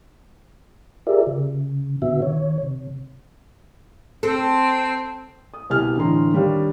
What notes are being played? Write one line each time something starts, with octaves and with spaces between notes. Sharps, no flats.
F4 G4 G#4 A#4 D5 E5
C#3
A#2 D3 B3 F#4 E5
D#3 C#5
C3
C4 A4
D#6
C2 B2 G4 G#5 F6
A2 D3 E3 A#5 C6
D#2 G3 D4 G4 C#5 F5